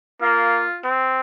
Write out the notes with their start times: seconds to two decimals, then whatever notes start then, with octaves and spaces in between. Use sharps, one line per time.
0.22 A#3 F4
0.84 C4